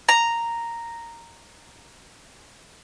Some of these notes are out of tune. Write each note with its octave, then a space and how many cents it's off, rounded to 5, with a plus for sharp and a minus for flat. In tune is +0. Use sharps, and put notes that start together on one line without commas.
A#5 -5